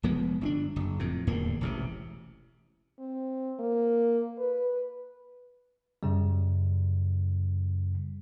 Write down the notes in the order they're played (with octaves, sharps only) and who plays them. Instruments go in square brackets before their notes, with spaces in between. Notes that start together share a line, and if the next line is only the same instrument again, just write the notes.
[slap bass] F1 F3 G#3 B3
G1 C4 D4
F#1
F2 A2
D1 E2 G2 A#3
E1 A1 C3
[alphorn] C4
A#3
B4
[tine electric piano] F#2 C#3 G3